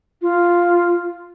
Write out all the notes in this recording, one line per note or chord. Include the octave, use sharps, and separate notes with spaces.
F4